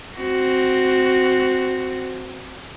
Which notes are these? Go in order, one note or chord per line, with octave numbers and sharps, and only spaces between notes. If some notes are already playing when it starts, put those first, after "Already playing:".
C4 F#4